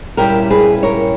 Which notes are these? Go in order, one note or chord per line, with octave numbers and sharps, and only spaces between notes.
A#2 G3 C#4 E4 G4 A#4
G#4 B4
A#4 C#5